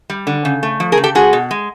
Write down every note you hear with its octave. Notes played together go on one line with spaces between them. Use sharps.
G3
D3
C#3
A3
F3
G#4 A#4
C#3
G4 A4
G#3 F#4 G#4
B2
G#3